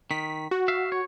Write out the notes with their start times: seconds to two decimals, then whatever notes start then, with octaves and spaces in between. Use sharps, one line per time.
0.11 D#3 B6
0.51 F#4
0.68 E5 F5
0.92 C#5